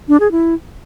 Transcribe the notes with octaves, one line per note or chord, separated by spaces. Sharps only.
D4
G#4
E4